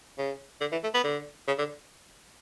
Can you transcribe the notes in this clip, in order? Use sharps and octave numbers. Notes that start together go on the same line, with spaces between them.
C#3
D3
E3
A3
B3
D3
C#3
D3